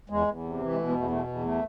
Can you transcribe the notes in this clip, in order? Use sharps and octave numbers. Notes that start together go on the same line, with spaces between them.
E2 G#3
E2
C3
E3
G#3
B2 A3
G#3 B3
E2 A3
B2 A3
E2
A3